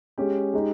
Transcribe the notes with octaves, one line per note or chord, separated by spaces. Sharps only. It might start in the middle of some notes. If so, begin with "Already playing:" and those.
G#3 C#4 G4
G#3 D#4 G4